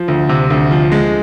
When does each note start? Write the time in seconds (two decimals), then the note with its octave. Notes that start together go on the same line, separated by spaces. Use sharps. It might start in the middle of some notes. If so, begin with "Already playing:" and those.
Already playing: F3
0.08 D2
0.29 C3
0.50 D2
0.71 F3
0.92 G#3